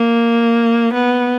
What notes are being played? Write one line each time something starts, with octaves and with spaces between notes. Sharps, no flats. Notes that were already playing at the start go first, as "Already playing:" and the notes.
Already playing: A#3
B3